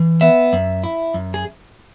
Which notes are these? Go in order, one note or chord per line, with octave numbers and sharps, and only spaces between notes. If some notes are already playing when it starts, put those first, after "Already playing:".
Already playing: E3
B3 E5
F#2
E4
F#2
G#4